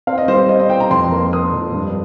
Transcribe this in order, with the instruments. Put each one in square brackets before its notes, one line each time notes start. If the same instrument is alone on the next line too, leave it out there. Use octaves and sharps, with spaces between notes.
[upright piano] C4 F5
D#5
G3 C5
C4 D#5
D#5
C4 G5
A#5
F2 C6
A#3
A#3 D#6
F2
G2